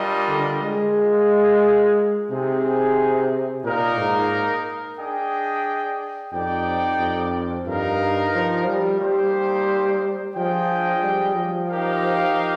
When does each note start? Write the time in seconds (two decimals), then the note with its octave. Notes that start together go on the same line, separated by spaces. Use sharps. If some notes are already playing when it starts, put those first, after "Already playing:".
Already playing: G3 D4 F4 A#4 D#5
0.28 D3
0.62 G#3
0.95 F4 A#4 F5
2.30 C3 C4 D#4 G#4 C5
3.64 A#2 A#3 D#4 A#4 F5
3.97 G#2
4.98 D4 G#4 D#5 G5
6.32 F2 D#4 G4 D5 G5
6.99 F2
7.66 G2 D#4 A#4 F5
8.35 F3
8.67 G3
9.01 G3 A#3 D#4 G4 C5
10.36 F3 D4 G#4 D#5 G5
11.03 G3
11.37 F3
11.70 D#4 G4 A#4 F5